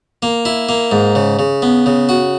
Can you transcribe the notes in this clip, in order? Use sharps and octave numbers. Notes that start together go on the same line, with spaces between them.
A#3
E4
A#3
G#2
C#3
C#3
B3
C#3
F#4